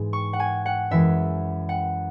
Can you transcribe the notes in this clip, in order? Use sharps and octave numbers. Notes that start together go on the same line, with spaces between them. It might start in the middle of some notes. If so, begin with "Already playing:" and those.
Already playing: G#2 E3 G#3
C#6
F#5
G#5
F#5
F#2 E3 G#3 E5
F#5